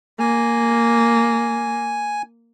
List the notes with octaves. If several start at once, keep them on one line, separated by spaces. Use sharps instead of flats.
A#3 G#5